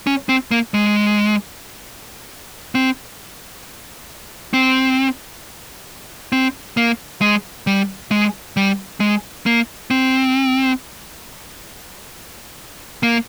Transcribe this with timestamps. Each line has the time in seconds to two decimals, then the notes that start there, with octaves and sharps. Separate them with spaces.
0.07 C#4
0.29 C4
0.51 A#3
0.74 G#3
2.75 C4
4.53 C4
6.32 C4
6.77 A#3
7.21 G#3
7.67 G3
8.11 G#3
8.57 G3
9.00 G#3
9.46 A#3
9.91 C4
13.03 A#3